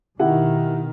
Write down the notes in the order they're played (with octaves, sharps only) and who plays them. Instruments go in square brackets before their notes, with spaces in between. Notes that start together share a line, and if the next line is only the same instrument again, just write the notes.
[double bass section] B2 D#3 [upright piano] E4 G4 F#5